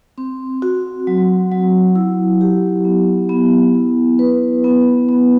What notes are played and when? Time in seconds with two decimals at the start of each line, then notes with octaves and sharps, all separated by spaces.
0.18 C4
0.62 F#4
1.07 F#3
1.51 F#3
1.95 E4
2.41 G4
2.85 B3
3.29 B3
3.75 E4
4.19 B4
4.64 B3
5.09 B3